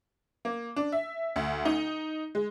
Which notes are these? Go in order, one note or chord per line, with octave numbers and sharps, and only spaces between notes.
A#3
D4
E5
D2
D#4
G#3